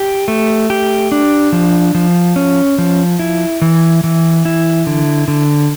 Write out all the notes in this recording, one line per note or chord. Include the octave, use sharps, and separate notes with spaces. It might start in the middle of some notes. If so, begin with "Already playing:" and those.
Already playing: G4
A3
G4
D4
F3
F3
C#4
F3
E4
E3
E3
E4
D3
D3